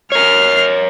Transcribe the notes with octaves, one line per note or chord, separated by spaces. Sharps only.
A#4 C#5 F6 C7